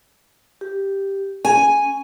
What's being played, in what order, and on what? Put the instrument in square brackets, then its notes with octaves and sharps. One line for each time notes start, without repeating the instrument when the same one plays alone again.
[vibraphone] G4
[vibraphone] C#4 [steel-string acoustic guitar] G#5